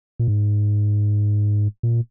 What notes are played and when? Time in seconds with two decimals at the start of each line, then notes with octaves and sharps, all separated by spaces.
0.20 A#2
0.28 G#2
1.83 A#2